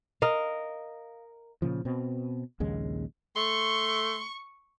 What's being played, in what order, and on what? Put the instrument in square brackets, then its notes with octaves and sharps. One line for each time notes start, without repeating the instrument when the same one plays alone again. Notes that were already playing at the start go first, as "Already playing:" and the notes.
[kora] A#4 D#5 F5
[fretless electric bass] A#2 C#3 F3
B2 C4
A#1 D#2 C#3 G#3
[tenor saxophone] A3 [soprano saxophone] C6 [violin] C#6